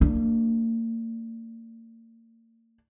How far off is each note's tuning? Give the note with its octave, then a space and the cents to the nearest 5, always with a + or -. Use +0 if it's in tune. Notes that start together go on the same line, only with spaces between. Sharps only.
A#3 -35 D4 +0